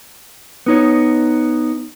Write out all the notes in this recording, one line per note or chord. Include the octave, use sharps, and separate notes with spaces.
B3 D#4 C#5